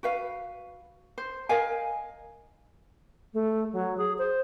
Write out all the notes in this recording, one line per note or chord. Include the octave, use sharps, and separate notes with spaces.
F#4 B4 F5
C5
A#4 D#5 F5 G#5
A3
F#3
G#4
C5